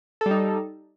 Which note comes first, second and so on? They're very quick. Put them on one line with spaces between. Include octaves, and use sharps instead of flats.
A4 G3 D#4